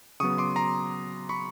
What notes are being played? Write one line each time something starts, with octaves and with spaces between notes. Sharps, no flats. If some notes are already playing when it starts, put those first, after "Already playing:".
C#3 F#3 B3 C#6 D#6
C6 D6
A#5 C6
B5 C#6